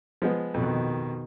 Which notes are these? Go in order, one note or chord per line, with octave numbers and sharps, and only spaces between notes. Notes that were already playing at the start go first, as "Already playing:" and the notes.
F3 G#3 B3
F2 B2 D#3